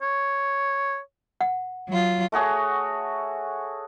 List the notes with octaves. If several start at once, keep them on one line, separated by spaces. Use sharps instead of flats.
C#5
F#5
F#3 F4
A3 F#4 G#4 C#5